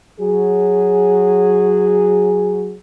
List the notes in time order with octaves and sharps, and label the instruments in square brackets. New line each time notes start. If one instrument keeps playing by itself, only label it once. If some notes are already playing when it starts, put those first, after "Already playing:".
[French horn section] F#3 G#4